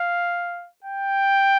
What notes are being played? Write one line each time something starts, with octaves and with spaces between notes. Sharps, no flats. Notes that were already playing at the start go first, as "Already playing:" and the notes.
Already playing: F5
G5